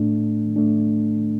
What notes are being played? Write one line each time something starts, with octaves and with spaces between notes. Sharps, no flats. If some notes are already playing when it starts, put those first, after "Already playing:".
Already playing: A2 A3 D4
A2 A3 D4